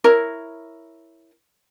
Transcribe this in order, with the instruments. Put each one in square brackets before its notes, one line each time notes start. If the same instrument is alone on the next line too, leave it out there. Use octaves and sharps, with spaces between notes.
[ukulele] E4 A#4 C#5